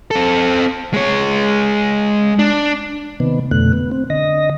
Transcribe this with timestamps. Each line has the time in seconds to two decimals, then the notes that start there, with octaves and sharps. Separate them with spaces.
0.11 C4 A4
0.94 G#3 C#5
2.39 D4
3.20 C3 D#3 B3
3.51 F2 B2 D3 A3 F#6
3.73 B3
3.91 C4
4.10 D3 D#5 A#6